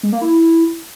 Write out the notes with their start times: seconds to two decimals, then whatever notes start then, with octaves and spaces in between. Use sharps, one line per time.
0.03 G#3
0.12 A#3
0.21 E4